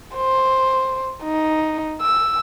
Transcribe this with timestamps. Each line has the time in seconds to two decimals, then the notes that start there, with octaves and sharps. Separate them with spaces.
0.15 C5
1.24 D#4
2.01 E6